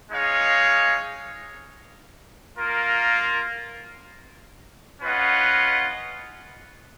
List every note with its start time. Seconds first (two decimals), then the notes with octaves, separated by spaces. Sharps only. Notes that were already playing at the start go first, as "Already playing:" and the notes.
0.11 G#3 D#4 G#4 C#5 F5
2.56 A#3 F4 A#4
5.02 C#4 F4 B4 D#5 F#5